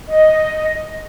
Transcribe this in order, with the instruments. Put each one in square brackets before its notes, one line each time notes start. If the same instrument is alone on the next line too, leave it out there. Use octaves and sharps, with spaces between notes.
[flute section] D#5